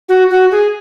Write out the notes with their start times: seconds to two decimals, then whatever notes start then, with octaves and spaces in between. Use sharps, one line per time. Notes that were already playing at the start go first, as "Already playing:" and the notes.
0.09 F#4
0.30 F#4
0.52 G#4